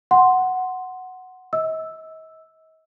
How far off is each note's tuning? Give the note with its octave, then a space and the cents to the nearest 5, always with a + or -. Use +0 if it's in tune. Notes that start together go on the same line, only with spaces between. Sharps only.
F#5 +0 C6 +0
D#5 +40 E6 +0